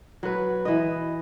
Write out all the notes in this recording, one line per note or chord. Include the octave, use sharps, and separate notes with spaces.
F#3 B4
E3 D#5